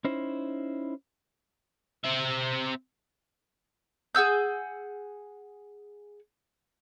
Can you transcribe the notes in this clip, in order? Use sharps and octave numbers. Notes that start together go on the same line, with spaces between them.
C#4 D#4 E4 C5
C4 E5
G#4 F#5 E6 G6